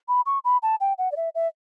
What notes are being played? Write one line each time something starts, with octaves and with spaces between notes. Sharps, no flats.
B5
C#6
B5
A5
G5
F#5
D5
E5
E5